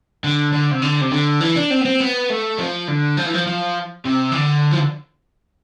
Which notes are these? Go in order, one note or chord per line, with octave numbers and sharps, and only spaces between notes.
D3
D3
C3
D3
C3
D3
E3
D4
C4
B3
C4
B3
A3
F3
D3
F3
E3
F3
F3
C3
E3
D3
F3